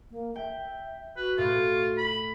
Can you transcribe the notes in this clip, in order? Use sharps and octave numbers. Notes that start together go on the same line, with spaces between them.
A#3
E5 G5
F#4 B4
A2 F4
B5